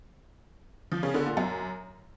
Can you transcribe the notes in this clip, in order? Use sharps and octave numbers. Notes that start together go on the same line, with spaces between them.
F3
C#3
D3
A#2
F#2